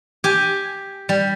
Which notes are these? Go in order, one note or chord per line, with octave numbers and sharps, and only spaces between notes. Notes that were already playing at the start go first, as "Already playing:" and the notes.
G4 G#5
G3